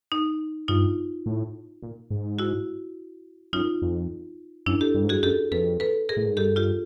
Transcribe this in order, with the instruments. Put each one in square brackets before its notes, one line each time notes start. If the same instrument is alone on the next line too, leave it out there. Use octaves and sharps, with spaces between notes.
[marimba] D#4
[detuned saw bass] G2 [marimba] D#4 F4
[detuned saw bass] A2
A#2
G#2
[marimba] E4 F#4
[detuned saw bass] F#2 [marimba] D#4 F4
[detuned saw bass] F2
[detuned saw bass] F#2 [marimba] D4 E4
[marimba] G4 A4
[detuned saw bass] G2
G#2
[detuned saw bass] G2 [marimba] F#4 G#4
[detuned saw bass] F#2 [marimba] G4 A4
[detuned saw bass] F2 [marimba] A4 B4
[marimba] A4 B4
G#4 A#4
[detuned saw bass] A2
G#2
[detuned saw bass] G2 [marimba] G4 A4
[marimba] F4 G4